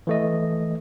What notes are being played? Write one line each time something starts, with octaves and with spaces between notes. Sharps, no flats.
E3 A3 D#5